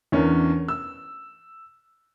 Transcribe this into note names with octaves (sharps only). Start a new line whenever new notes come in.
E2 C#4 D4 A#4
E6